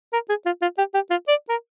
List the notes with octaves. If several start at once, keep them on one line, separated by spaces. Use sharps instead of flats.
A#4
G#4
F4
F4
G4
G4
F4
D5
A#4